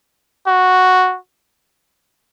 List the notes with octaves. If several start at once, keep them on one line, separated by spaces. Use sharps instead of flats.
F#4